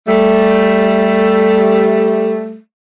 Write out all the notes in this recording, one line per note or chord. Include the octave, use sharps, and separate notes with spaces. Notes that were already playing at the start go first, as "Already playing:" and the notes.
G3 A3